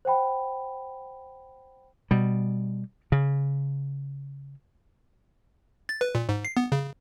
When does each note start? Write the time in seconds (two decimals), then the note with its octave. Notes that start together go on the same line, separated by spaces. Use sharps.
0.05 C5 F#5 G5 B5
2.11 B2 G3
3.12 C#3
5.89 A6
6.01 B4
6.15 A#2
6.29 G#2
6.45 C7
6.57 B3
6.72 C#3